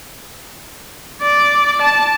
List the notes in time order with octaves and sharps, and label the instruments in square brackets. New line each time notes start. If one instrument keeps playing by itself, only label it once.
[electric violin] D5
A5